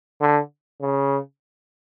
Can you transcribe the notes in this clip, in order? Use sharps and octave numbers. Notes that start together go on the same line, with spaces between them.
D3
C#3